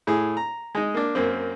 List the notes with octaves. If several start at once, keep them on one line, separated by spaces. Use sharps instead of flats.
A2 G#4
A#5
G#3 D#4
A#3 D4
F#2 A#3 C4